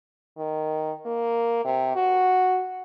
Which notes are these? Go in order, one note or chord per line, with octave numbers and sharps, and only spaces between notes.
D#3
A#3
C3
F#4